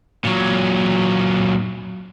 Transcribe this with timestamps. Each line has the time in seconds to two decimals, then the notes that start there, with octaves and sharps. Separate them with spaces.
0.25 A#2 F#3